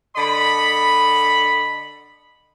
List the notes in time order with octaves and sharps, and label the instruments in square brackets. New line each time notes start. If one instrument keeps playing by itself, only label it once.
[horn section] D3 D#5 B5